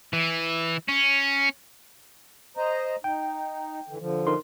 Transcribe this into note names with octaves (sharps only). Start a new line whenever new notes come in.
E3
C#4
C5 D#5 A#5
D#4 G5
D3 E3
D3 F3
D#4 A#4 C6